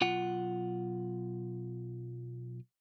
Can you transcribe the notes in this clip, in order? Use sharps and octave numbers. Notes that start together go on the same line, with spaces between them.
B1 F4 F#5